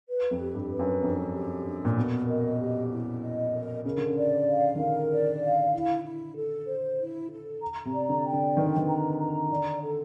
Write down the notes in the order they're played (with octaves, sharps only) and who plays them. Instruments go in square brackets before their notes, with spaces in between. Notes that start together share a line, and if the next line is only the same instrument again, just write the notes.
[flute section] B4
[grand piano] F2
[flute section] G4
[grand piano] G2
[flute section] B4
[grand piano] F#2
[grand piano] F2 [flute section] D4
[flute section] G4
D4
[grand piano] A#2
[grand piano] B2 [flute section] A#4
[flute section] D#5
G4
E4
D#5
A#4
[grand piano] C#3 [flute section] A#4
[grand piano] D3
C#3
[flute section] D5
F5
[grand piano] D#3
[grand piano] D3 [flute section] A#4
[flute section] D5
F5
E4
E4
A4
C5
E4
A4
A#5
[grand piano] C3
[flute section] D5
[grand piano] D3
[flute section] G5
[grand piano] D3
[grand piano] D#3 [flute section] B4
[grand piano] D3
D#3
[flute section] A#5
A#5
[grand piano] D3 [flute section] D5
[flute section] A4